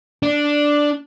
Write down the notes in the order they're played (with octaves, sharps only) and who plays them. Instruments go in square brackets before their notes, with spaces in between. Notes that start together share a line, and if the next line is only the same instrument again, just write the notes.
[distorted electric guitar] D4